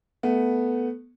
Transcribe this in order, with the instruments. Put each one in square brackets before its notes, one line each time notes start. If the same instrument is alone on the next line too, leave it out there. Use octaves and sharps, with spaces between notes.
[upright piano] A3 B3